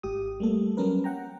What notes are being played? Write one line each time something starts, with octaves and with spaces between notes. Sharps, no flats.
G#1 G#2 G4 D#6
G3 A3 A#3 A4
F#3 G3 B3 C#4 A#4 B4
F#5 G5 A#5